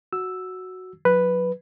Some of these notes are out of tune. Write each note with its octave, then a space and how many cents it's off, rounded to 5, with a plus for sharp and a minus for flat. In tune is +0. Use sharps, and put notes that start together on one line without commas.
F#4 +0 E6 +0
F#3 -30 B4 +0